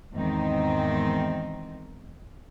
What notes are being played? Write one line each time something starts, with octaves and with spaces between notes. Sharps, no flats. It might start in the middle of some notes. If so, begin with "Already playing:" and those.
E2 G#2 D#3 C4 D#4